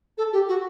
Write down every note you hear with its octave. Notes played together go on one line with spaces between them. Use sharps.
A4
G4
F#4